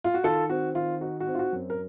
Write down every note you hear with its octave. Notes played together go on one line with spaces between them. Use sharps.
F4
F#4
D#3 F4 A4
C4 F#4
D#3 F4
D#4 F#4
F#4
C4
F4
F#4
F#2
A#4